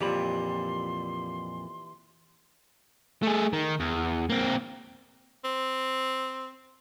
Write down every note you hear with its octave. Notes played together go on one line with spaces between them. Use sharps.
F2 A#2 E3 G3 G4 B5 C6
A3 G#4
D#3
E2
A#3 C4
C4